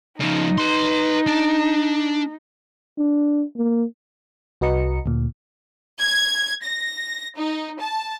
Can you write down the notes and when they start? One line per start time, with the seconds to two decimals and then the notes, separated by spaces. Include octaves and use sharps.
0.20 C#3 F3 D#4
0.58 B4 C6
1.27 D4
2.98 D4
3.56 A#3
4.61 C2 F#4 B4 D#5 A#5 C#7
5.06 D2 A#2
6.00 G#6
6.64 A#6
7.37 D#4
7.80 A5